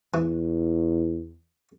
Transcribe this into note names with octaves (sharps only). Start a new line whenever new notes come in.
E2 E3